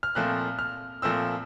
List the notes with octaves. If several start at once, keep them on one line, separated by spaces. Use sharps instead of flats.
F6
A#2 F3 A3 C4 F#6
F6
A#2 F3 A3 C4 E6